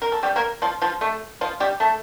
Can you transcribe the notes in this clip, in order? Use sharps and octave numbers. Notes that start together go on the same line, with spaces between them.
A#4
A4
G3 G4
A#3 A#4
F3 F4
F3 F4
A3 A4
F3 F4
G3 G4
A3 A4